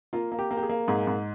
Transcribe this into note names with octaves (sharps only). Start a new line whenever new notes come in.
A#3 F4
A#3
G4
A#3
G4
G#4
A#3
G#2 G#4
G#2